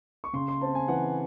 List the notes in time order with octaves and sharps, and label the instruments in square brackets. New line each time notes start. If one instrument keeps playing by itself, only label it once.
[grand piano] C#6
C#3 C6
C6
C4 A5
G#5
E3 F#5